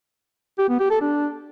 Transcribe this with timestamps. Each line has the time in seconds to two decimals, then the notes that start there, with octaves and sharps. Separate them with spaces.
0.58 G4
0.69 B3
0.80 G4
0.90 A4
1.01 D4